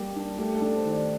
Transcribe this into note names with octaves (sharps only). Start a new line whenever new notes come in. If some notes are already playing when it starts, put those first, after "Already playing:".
Already playing: G3 A#3 G4
D4
A3 G4
A4
D4
C5
D#3
D5